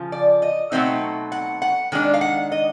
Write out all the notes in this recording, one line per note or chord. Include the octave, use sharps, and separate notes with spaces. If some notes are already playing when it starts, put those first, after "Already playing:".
Already playing: C#3 F3 F4
D5
D#5
B2 F#3 A3 C4 D#4 E5
F#5
F#5
D#3 G#3 D4
F5
F#5
D#5